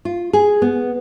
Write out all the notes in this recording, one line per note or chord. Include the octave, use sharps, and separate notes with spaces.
F4
G#4
B3